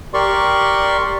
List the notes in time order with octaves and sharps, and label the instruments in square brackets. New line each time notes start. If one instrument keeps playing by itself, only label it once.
[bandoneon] G4 A#4 D5 C6 C#6